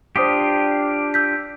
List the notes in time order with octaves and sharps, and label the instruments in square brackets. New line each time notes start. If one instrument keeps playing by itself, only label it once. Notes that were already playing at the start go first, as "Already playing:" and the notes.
[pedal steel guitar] D4 F4 G4 [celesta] C5 D#6 B6
[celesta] E6 G6 B6